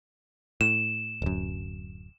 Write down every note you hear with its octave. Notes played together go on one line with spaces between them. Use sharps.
A2 E7
D1 F#2